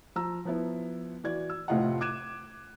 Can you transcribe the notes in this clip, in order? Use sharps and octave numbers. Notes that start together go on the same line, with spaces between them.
F3 A#5 E6
F3 B3 E4
E3 F#4 D5 G#6
E6
F1 A2 C3 F4 D#5 F#5
D6 F#6 G#6 D#7 E7